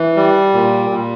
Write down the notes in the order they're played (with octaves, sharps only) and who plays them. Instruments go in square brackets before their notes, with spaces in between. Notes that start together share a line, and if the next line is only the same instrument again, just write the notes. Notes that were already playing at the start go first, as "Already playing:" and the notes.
Already playing: [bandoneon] E3
G3
A#2
A#2